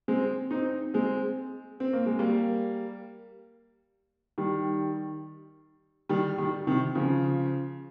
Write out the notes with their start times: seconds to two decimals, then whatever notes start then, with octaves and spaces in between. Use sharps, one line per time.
0.08 G#3 C4
0.51 C4 D#4
0.94 G#3 C4
1.80 C4
1.93 A#3
2.06 G#3
2.19 G3 A#3
4.38 D#3 G3
6.09 D#3 G3
6.38 D#3 G3
6.67 C3 D#3
6.95 C#3 F3